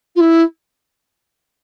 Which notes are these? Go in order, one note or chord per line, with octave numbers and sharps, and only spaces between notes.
F4
E4